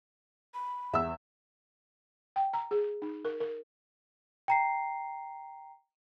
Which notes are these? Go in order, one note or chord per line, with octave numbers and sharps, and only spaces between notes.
B5
E2 E5 E6
G5
A#5
G#4
D#4
A#4
A#4
G5 A#5 C7